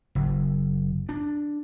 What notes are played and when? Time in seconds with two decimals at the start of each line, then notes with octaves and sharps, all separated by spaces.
0.15 F#1
1.09 D4